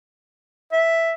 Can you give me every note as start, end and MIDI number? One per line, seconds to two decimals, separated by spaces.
0.72 1.14 76